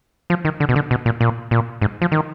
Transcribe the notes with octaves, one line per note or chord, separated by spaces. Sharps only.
F3
D#3
D3
B2
D3
B2
A#2
A#2
A#2
G#2
F3
D#3